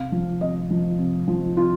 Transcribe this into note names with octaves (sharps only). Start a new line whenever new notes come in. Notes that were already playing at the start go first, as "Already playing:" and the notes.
Already playing: C3 F5
F3
C3 D#5
F3
C3
F3
C3 F4